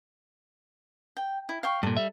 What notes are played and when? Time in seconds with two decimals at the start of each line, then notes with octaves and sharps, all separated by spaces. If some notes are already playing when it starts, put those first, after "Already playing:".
1.17 G5
1.49 E4
1.63 F5 G5 C#6
1.83 G2 A#2 A4
1.97 G3 E5